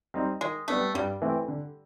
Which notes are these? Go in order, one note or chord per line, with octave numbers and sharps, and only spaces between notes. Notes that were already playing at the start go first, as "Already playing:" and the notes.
G3 C4 D#4
D#3 G#3
G3 A3 B3 D4
G2 G3
E3 A3 C4 E4
D3